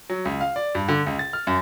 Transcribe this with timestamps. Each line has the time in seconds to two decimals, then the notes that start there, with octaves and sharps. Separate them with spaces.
0.10 F#3
0.25 C#2
0.41 F5
0.56 D5
0.75 G2
0.88 D3
1.07 C#2
1.19 A6
1.33 F6
1.47 F#2